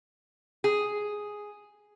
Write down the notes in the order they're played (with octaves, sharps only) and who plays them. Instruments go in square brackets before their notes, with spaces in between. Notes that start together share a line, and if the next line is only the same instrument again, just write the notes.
[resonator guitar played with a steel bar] G#4